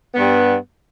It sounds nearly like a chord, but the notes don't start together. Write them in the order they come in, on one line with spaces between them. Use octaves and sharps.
B3 G2 G3